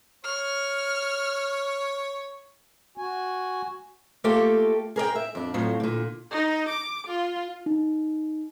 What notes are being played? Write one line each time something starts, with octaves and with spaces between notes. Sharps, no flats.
C#5 F6
F#4 G#5
A3 A#3 F4 G4 A4
G#4 A#4 D5 G5
E5
F2 D4
F2 A2 F3 F#3
A#2 D3
D#4
D6
F4
D#4